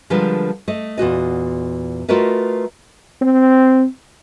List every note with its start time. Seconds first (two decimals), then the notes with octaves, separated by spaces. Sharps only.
0.10 D3 F3 G3 G#3 A#4 B4
0.68 A3 D#5
0.98 E2 A#2 F#4 D#5
2.09 A3 F4 F#4 A#4 B4 D#5
3.21 C4